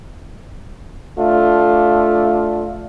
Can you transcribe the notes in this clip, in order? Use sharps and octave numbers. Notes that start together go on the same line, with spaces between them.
A3 D4 F4